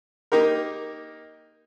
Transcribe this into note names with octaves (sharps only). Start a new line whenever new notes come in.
A#3 D#4 G4 A#4